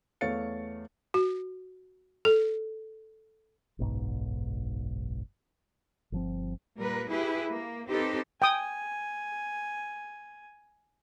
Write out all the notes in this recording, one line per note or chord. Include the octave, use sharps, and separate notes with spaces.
E2 A3 C#5 F5 A6 C#7
F#4
A4
F#1 B1 G#2
G1 F3 C4
A#2 G3 A#4 B4
E4 G4 G#4 B4
A#3
C4 D#4 G4 A4 B4 C5
G5 G#5 D#6